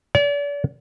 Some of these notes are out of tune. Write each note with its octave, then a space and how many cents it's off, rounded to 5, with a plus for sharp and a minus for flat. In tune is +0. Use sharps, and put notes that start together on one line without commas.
D5 -40